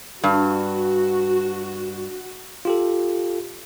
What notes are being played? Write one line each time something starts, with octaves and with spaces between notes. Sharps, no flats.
G2 F#4
F4 G4 A4